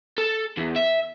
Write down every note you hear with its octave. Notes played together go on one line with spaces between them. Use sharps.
A4
E2
E5